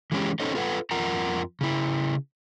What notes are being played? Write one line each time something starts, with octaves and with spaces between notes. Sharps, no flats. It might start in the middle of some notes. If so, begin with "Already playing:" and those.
E3 G#3 C#4 G4
C#4 D#4 A4 C5 C#5 D#5
F4 A4 B4 F5 F#5
F2 F4 A#4 F#5 A#5
C#3 E4